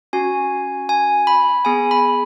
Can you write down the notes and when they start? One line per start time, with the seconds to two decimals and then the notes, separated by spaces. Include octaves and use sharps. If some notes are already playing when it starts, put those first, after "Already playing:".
0.13 C#4 F#4 G#5
0.89 G#5
1.27 B5
1.65 B3 G#4 G#5
1.91 B5